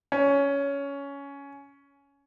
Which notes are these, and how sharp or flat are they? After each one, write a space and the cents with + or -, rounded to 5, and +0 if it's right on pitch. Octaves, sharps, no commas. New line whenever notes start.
C#4 +15